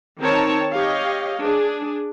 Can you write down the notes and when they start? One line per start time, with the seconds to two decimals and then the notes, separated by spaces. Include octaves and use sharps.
0.20 D#3 C4 D#4 A#4 C#5 A5
0.74 G4 C#5 D#5 F5
1.40 D4 G#4